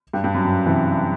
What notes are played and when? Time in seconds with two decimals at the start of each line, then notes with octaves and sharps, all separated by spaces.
0.13 G2
0.24 G2
0.34 F#2
0.45 F#2
0.66 C3 E3